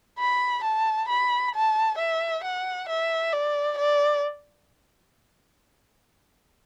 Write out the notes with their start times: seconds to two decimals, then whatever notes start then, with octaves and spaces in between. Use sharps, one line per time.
0.19 B5
0.64 A5
1.09 B5
1.54 A5
1.98 E5
2.44 F#5
2.89 E5
3.32 D5
3.78 D5